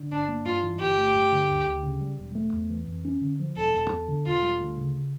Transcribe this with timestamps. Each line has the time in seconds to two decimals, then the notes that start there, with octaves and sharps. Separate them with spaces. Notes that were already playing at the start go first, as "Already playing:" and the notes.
Already playing: D3
0.11 G1 D4
0.28 A#3
0.45 G2 F4
0.63 E3
0.79 G1 G4
0.98 A3
1.14 G2
1.32 D3
1.49 D2
1.67 D2
1.83 C#3
2.01 G3
2.19 E1
2.35 A3
2.53 E2
2.70 E3
2.88 F2
3.05 C#4
3.21 D3
3.39 F3
3.56 E1 A4
3.74 E1
3.90 E2
4.08 D3
4.25 E1 F4
4.42 G3
4.60 D2
4.77 C#3